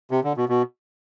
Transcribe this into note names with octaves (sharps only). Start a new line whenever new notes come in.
C3
D3
B2
B2